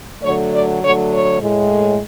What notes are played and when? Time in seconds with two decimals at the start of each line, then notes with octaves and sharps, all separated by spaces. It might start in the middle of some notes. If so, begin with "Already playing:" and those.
0.22 D3 F#3 A3 C#5
0.52 D5
0.82 D3 F#3 A3 C#5
1.11 C#5
1.40 A2 G#3